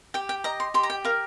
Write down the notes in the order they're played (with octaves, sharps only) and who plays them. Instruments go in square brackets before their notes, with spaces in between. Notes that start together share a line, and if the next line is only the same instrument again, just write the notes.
[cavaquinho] G4 G5
G5
D#5 A#5
C6
G4 C6
A#5
G5
A#4 F5